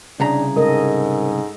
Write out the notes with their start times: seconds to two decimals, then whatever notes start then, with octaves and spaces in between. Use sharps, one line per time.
0.20 C2 C#3 D4 G#4 A#5
0.56 G#2 G#3 A4 A#4 D#5